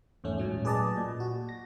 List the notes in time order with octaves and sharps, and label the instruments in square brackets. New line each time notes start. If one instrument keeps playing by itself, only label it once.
[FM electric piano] E2 G#2 A3 C#4
A#2 F#3 C#4
G#4 B4 D5 D#5 A5
A#2
F#4
A#6